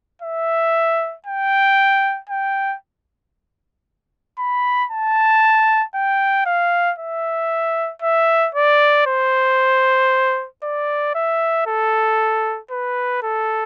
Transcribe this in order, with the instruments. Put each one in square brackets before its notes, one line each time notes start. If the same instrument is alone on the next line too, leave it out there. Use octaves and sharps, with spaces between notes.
[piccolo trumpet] E5
G5
G5
B5
A5
G5
F5
E5
E5
D5
C5
D5
E5
A4
B4
A4